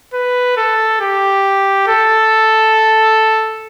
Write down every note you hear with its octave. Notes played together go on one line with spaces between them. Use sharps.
B4
A4
G4
A4